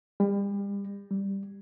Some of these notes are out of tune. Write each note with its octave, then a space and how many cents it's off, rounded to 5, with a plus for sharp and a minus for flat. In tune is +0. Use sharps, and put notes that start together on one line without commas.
G3 +35
G3 +0